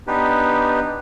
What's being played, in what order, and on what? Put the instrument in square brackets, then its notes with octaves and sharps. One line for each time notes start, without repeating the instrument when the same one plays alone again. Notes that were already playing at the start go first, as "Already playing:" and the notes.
[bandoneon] B3 D4 D#4 G4 B4